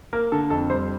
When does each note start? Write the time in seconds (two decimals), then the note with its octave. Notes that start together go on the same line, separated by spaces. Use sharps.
0.13 A#3 A#4
0.32 D3 A4
0.50 F2 A4
0.70 G3 C5